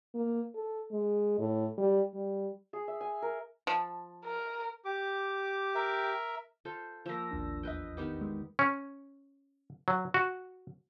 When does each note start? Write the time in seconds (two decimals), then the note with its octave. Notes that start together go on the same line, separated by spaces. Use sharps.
0.15 A#3
0.55 A4
0.92 G#3
1.39 A2
1.78 G3
2.15 G3
2.73 G#4
2.88 E5
3.01 G#5
3.22 A#4
3.67 F3
4.25 A#4
4.85 G4 D6
5.75 A#4 E5
6.65 F4 A4 C5
7.06 F3 A#3 E6 A#6
7.31 A1 D#2 D4
7.63 E2 B4 D#5 G5
7.97 D#3 B3 G4
8.21 G#3
8.59 C#4
9.88 F#3
10.14 F#4